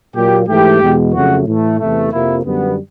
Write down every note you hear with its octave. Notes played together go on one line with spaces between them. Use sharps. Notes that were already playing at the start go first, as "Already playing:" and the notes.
A#2 F#3 A#3 G4
G#2 E3 A3 G4
E2 B2 G#3 B3
F2 C#3 F#3 A3 F#4
A2 E3 A3
E2 C3 E3 A3
F2 C3 F3 A#3 E4
F#2 D3 G3 B3